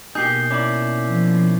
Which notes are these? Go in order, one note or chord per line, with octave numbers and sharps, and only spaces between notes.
B2 A#3 D#4 G4 G#4 G6 C7 G7
C#4 E4 D5 D6
F3